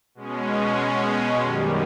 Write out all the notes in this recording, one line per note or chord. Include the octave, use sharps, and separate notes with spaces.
B2 G#3 C#4
F#2 D#3 G3